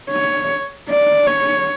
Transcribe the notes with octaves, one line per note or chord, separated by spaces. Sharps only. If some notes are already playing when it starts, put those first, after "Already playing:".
C#5
D5
C#5